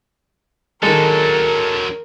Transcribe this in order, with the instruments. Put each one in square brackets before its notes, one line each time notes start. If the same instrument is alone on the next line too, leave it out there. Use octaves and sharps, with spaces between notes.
[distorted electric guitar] D3 F#3 [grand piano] D#3 G#3 [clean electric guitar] A4 [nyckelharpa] A#4